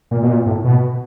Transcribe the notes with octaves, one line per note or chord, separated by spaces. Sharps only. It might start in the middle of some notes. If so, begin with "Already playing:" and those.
A#2
B2
A#2
A2
B2